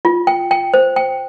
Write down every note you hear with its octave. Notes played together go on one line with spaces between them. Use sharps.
F4
G5
G5
C5
G5